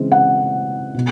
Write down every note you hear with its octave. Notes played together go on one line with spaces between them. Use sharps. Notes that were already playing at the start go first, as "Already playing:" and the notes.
Already playing: C#3 E3 G#3 C4
F#5
B2